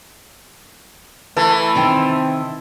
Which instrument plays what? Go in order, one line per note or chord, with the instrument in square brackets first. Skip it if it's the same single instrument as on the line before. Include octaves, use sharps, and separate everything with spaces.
[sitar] E3 [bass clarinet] A3 [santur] A4
[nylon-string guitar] C3 D#3 G5 [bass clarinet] C4